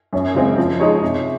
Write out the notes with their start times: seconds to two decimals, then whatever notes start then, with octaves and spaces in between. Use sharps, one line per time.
0.13 F#2 C#4
0.35 C#3 G#3 C4
0.58 F3
0.80 G#3 D#4 G#4 C#5
1.02 C3